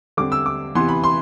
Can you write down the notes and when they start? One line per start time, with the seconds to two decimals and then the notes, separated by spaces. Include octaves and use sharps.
0.17 D3 G3 C4 D6
0.32 E6
0.46 D6
0.75 C3 E3 B3 C6
0.89 B5
1.04 C6